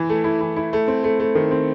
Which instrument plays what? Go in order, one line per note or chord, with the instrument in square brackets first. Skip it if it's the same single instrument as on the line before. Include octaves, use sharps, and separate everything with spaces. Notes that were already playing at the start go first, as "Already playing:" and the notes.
Already playing: [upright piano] E3 E4
A3
E4
E3
E4
A3
C4
A3
A3
D#3
C4